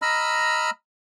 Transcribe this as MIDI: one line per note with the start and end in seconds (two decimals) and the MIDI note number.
0.02 0.70 75
0.02 0.70 82
0.02 0.70 83
0.02 0.70 88
0.02 0.70 89